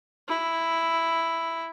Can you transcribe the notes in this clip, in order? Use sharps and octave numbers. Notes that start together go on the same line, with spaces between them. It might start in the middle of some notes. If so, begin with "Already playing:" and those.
E4